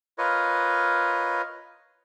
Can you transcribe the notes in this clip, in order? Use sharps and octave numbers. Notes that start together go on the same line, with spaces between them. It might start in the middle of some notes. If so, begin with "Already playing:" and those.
F4 A#4 B4 C#5 D#5